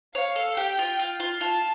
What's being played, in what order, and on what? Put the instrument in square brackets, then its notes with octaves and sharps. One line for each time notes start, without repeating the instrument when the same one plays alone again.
[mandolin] C#5 [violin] F5
[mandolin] A4
[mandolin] G4 [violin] G5
[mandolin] F4
F4
F4
[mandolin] F4 [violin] A5